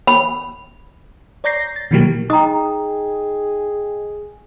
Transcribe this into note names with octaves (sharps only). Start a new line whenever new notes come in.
B5
C#5 D5 A#5 G6 A#6 C7
A6
B2 D#3 E3 F#3 A#3 G4
D#4 G#4 D#5 G5 A#5 D#6